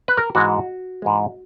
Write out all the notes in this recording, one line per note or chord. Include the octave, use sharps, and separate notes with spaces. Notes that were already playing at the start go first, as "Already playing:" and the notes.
B4
A#4
G#2 E3 G#3 F#4
G#2 E3 G#3